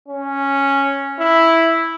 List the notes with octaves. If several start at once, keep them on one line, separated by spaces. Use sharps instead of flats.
C#4
E4